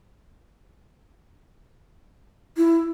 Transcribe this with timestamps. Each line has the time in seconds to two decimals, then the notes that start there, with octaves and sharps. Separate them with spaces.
2.57 E4